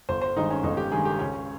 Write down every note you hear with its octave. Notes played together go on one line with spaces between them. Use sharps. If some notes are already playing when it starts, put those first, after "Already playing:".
G1 C5
C5
G2 D#3 G#3 D#4
C#4
G1 D#4
G4
G2 D#3 G#3 G#4
G4
C#2 C#4